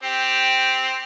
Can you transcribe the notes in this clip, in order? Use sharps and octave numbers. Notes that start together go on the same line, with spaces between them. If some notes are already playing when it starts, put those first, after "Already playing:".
C4 G4